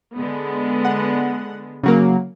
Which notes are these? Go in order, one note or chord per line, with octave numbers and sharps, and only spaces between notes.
D3 G#3 B3
F#5
C#3 F#3 A#3